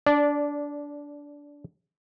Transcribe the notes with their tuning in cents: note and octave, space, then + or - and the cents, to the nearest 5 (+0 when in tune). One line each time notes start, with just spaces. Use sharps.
D4 -20 D5 +0